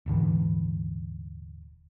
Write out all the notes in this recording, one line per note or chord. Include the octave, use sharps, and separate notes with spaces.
D#1 G#2 D3 E3